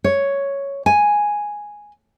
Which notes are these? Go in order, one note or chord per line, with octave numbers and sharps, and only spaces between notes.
C#5
G#5